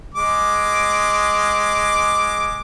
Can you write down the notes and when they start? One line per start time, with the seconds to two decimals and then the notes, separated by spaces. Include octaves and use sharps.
0.14 G#3 D6